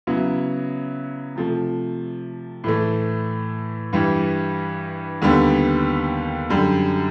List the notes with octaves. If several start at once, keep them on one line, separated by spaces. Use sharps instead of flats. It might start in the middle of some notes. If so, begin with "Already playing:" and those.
C#3 F#3 B3 E4
C3 F3 A3
A2 E3 A3
G2 E3 G3
D#2 D3 G3 B3
F#2 D3 G3